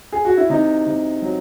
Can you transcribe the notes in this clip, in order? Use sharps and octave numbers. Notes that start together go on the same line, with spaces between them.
G#4
F#4
E4
C3 D#4
C3
F#3